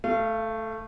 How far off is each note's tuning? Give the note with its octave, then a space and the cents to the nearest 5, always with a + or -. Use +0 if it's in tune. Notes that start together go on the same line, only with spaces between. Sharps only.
A3 +0 F5 -35